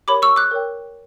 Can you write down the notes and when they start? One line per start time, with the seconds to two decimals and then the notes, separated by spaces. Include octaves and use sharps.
0.08 G4 A#4 C#5 B5 D6
0.22 C#6 E6
0.36 D6 F#6
0.51 A#4 C#5 G5